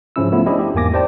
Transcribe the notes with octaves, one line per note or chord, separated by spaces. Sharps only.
G#2 C#3 F3 C#4 E4 E6
F3 A3 B3 E4 F4
C#4 D4 E4 G4 C5 D#5
G4
E2 G#2 A#3 G#5 D6 A#6
G4 C5 D5 G5 A5